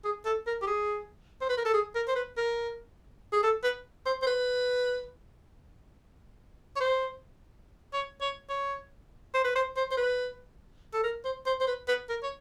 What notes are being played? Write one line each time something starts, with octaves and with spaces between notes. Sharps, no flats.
G#4
A4
A#4
G4
G#4
C5
B4
A#4
A4
G#4
A#4
C5
B4
A#4
G#4
A4
B4
C5
C5
B4
C#5
C5
C#5
C#5
C#5
C5
B4
C5
C5
C5
B4
A4
A#4
C5
C5
C5
B4
B4
A#4
C#5